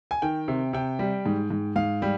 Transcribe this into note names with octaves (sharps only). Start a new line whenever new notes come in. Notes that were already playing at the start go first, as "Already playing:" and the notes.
G#5
D#3 G5
C3
C3 G5
G3
G#2
G#2
G#2 F5
G3